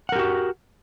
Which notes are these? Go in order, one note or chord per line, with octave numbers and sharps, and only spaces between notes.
F#4 G4 A#4 F#5